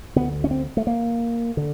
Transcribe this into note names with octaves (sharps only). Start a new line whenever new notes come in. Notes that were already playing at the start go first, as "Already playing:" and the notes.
D2 D3 B3
C#4
C4
A3
A#3
D3